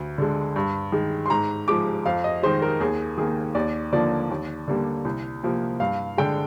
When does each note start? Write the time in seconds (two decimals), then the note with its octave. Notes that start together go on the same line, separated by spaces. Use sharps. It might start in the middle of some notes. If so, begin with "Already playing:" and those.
Already playing: D2
0.18 D3 G#3
0.56 G2
0.92 D#3 G#3
1.26 C6
1.30 G#2 A#5
1.68 F3 G#3 D6
2.06 F2 F5
2.24 D#5
2.43 D#3 G#3 C5
2.62 A#4
2.80 D#2 G#4
3.18 D#3 A#3 G#4
3.55 D#2 D5
3.93 D3 F3 A#3 D5
4.30 D#2
4.68 D3 G3 A#3
5.05 C2
5.43 C3 F3 A#3
5.80 G2 F5
6.18 D3 G#3 G5